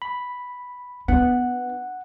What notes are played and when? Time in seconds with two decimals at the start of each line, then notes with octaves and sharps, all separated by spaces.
0.02 B5
1.08 B3 D4 F#5